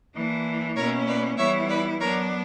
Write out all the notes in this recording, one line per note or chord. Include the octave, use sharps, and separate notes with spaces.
E3 A#3 D4
B2 A#3 C#4 E4 A#4 C#5
B4 D5
E3 G3 B3 E4 C#5 E5
B4 D5
F#3 B3 D4 A#4 C#5